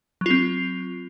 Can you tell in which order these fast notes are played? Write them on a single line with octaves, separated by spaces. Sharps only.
F#3 F4 C4